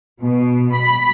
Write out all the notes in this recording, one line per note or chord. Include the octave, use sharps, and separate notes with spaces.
B2
B5